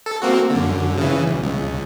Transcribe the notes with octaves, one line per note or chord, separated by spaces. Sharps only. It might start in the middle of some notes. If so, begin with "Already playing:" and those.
A4
A#3 C4 F#4
F#2 D3
C#3 E3
B1
C#2